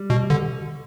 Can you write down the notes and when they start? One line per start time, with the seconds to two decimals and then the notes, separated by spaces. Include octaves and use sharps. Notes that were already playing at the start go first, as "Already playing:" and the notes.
Already playing: G3
0.10 B2
0.30 D3